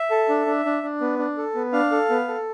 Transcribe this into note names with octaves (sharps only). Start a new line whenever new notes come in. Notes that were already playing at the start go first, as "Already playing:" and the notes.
Already playing: E5
A4
D4
D4
D4
D4
B3
D4
A4
B3
D4 F5
A4
B3
A4